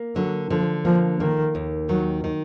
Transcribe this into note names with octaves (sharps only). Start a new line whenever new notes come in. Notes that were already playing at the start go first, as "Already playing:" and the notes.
Already playing: A#3
D3 F#3
D3 F3
F3 A#3
D#3 A#3
D#2
D#3 F#3
D#3